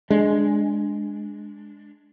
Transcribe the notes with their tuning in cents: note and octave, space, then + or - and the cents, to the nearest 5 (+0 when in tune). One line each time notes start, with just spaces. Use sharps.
G#3 +0 D4 +0